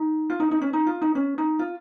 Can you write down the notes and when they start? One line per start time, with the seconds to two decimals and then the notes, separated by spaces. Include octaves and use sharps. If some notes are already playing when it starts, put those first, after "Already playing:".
Already playing: D#4
0.30 F4
0.40 D#4
0.51 D#4
0.62 C#4
0.73 D#4
0.86 F4
1.02 D#4
1.15 C#4
1.38 D#4
1.59 F4